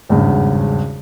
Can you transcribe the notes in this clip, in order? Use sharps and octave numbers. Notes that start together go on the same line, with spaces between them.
G#1 E2 G2 C#3